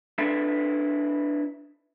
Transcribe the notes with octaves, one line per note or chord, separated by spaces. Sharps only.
D4 E4 A4 B4 C5 E5